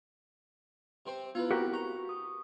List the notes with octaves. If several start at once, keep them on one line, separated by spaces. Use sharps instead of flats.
C3 C4 C5
B3 E4 F4 B4
C4 F#4 G4 A#4
A#5 C#6
C#6 D#6